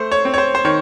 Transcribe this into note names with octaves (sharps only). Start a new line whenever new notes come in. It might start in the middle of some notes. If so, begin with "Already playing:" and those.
Already playing: A3 C5
C#5
C4
C#5
C5
C5
D#3 C#5